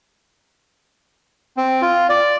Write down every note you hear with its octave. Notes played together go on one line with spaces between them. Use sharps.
C4
F4
D5